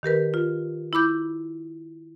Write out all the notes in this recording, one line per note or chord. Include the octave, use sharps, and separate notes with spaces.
D#3 G4 A#4 B4
F4
E4 B5 D6 G6